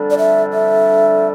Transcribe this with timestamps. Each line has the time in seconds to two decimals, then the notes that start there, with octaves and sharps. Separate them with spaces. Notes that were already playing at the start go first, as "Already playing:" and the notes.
Already playing: F2 D3 G3 D4 A4
0.11 D5
0.18 E5
0.53 E5